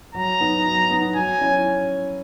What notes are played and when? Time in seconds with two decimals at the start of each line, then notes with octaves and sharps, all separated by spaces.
0.15 F#3 A#5
0.40 B3 D#4
0.66 F#3
0.90 B3 D#4
1.16 F#3 G#5
1.41 C#4 E4